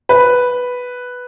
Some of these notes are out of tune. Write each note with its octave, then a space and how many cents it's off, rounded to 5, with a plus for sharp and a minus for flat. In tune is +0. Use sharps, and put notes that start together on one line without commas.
B4 +0